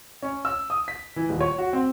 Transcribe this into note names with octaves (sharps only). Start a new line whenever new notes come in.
C#4
E6
D#6
B6
E3
D#1
C#5
F#4
C4